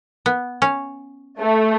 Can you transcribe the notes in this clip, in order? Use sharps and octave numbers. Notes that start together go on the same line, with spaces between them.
B3
C#4
A3